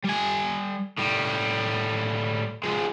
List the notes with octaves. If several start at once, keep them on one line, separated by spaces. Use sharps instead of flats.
G3 G#5
A2 G3
F3 G#3